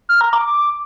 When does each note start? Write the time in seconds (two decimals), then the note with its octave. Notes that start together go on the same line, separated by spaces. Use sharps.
0.09 F6
0.21 A#5
0.33 D6